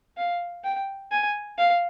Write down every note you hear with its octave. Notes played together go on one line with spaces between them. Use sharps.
F5
G5
G#5
F5